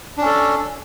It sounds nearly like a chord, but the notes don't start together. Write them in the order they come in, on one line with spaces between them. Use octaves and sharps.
D4 C#4 A4